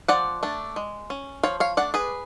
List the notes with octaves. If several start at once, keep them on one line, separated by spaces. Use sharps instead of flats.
F3 D5 F#5
A3 D4
G#3
C#4
F3 C#5 F5
C#5 F5
A3 D4 D5 F#5
G#4 B4